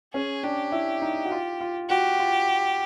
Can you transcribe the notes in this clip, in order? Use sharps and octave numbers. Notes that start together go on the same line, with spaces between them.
C#4 G#4
D4 G4
E4
D#4
F#4
F4
F4
F#4 G4
F4